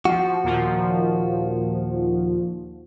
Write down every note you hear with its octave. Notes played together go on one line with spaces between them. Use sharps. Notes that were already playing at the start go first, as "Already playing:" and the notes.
F3 F#4
D#2 A#2 F3